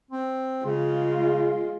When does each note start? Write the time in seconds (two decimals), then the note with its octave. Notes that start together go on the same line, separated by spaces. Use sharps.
0.11 C4
0.65 C#3 G#3 F4